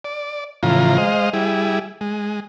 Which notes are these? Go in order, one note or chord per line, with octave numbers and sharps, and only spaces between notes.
D5
A2 C#3 E3 F3 F4 A#5
G#3 C5 D#5 F5
G3 E4 G#4
G#3